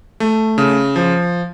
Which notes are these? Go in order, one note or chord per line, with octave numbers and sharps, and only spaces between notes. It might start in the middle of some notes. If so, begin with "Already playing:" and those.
A3
C#3
F3